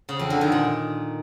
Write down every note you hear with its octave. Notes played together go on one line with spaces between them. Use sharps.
C#3
F2
D3
D#3
A#2